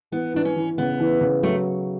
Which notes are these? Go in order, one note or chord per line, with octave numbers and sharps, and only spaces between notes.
E3 B3
E3 D4
C#4
E3
C#3 B3
E3
C#3
F#3 A3